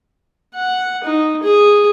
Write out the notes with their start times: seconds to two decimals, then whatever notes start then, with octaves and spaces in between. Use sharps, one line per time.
0.55 F#5
1.04 D#4
1.43 G#4